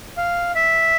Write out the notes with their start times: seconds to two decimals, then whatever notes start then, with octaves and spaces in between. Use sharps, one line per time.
0.17 F5
0.55 E5